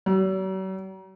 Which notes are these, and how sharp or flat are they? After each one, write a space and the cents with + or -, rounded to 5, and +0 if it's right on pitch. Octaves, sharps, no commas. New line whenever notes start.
F#3 +45